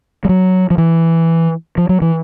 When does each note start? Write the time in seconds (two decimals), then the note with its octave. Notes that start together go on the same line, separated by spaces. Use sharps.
0.25 G3
0.29 F#3
0.70 F3
0.78 E3
1.78 F3
1.89 F#3
2.02 E3